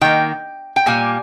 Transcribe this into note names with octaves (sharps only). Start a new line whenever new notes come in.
D#3 A#3 G5
G5
A#2 G3 A#3 G#5